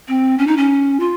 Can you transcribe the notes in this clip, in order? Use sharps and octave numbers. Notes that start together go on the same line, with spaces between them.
C4
C#4
D#4
C#4
F4